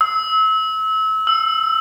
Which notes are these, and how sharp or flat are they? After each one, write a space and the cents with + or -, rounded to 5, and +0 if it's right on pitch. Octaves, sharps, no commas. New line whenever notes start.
E6 -30
E6 +15